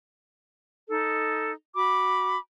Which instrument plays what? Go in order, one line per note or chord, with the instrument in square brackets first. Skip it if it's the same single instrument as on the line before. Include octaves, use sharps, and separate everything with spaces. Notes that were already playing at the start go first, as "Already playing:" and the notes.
[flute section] D#4 A4
F#4 B5 D6